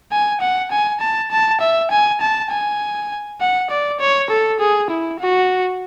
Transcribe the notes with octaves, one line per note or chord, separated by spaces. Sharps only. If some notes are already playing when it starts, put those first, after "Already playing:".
G#5
F#5
G#5
A5
A5
E5
G#5
A5
G#5
F#5
D5
C#5
A4
G#4
E4
F#4